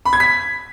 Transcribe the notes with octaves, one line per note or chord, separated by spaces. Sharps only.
B5
G#6
B6